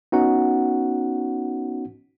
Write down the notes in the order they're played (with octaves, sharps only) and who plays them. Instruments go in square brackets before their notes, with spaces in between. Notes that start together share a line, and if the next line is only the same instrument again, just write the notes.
[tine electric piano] B3 C#4 D#4 F#4 F#5